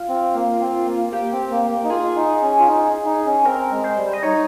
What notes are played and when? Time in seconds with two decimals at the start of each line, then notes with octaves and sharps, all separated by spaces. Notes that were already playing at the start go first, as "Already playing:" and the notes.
Already playing: F4
0.09 C4
0.35 A#3
0.60 C4
0.86 A#3
1.13 A#3 G4
1.32 C4
1.51 A#3
1.70 A#3
1.84 D#4
1.90 F4 G#4
2.16 D#4
2.42 C#4
2.60 F4
2.68 D#4
3.06 D#4
3.26 C#4
3.45 C4 A#4
3.71 G#3
3.84 C5
3.97 G3
4.13 D#5
4.23 D#4 C#5